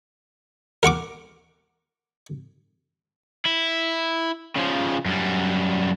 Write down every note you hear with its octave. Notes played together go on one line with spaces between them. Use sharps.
A#4 F#5 C#6 D6
E4
C#3 F3
F#2 G3